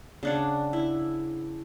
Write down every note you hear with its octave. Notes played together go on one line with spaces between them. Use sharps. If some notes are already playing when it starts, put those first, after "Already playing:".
C#3 D4 F#5
E4